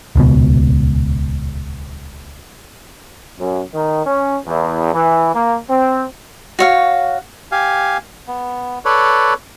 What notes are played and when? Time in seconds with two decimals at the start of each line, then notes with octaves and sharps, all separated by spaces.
0.16 D#1 C#2 B2
3.39 F#2
3.74 D#3
4.06 C#4
4.46 E2
4.93 E3
5.35 A#3
5.70 C4
6.59 F#4 C#5 F5
7.52 G4 F5 G#5
8.28 B3
8.85 A4 B4 C#5 D5